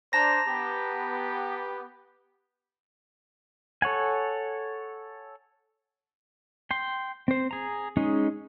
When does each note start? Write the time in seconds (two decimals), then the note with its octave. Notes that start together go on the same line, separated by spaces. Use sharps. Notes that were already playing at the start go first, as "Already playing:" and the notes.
0.13 D4 C5 A5 A#5 A#6
0.46 B3 G4
3.82 A4 C#5 F#5 G#5
6.71 G5 C6
7.28 C4 C5
7.51 G#4 A#5
7.97 G#3 C#4 D#4 G#4